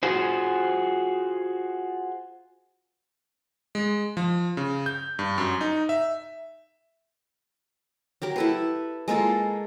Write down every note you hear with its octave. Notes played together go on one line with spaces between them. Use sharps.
F4 F#4 G#4 C5
G#3
F3
C#3
G6
G2
F#2
D#4
E5
F#3 G4 A#4
E4 A4 B4
G#3 A#3 F4 A4